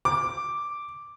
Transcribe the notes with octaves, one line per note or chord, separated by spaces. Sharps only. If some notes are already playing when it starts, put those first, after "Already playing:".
D6